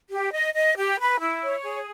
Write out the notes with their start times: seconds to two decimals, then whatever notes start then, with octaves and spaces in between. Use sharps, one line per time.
0.10 G4
0.32 D#5
0.54 D#5
0.76 G4
0.99 B4
1.20 E4
1.42 C#5
1.64 G#4